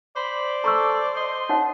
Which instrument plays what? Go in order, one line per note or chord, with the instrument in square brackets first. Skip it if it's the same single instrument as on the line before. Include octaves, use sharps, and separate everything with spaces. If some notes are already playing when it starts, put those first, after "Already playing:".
[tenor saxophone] C5 [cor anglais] D5 [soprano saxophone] B5
[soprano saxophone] A4 [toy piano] A#5 C#6 E6
[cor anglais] D#5 [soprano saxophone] C6
[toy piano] D#4 C#5 F#5